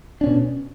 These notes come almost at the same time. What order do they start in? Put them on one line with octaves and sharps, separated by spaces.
D4 C#4 B2